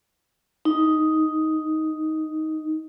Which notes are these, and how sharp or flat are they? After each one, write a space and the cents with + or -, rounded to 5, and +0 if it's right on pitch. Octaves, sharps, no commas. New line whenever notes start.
D#4 +5